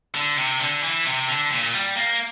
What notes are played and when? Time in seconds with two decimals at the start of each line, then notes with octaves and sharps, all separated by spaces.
0.15 D3
0.37 C3
0.60 D3
0.83 E3
1.06 C3
1.28 D3
1.51 A#2
1.74 G3
1.96 A#3